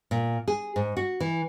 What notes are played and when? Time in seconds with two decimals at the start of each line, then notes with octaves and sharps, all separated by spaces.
0.11 A#2
0.48 G#4
0.76 G#2
0.97 F#4
1.20 E3